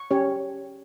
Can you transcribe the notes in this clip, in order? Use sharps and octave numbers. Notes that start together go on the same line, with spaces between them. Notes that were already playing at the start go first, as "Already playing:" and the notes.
Already playing: C#6
C#4 G4 C#5